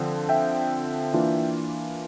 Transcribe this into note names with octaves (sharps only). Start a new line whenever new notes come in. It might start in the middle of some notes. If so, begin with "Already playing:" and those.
Already playing: D3 F3 C4
E5 G5
E3 A#3 D4 F4